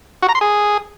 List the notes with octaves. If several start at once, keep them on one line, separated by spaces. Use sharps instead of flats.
F#4
A#5
C6
G#4